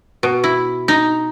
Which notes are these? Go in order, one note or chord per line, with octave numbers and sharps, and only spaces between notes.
B2
E4
D#4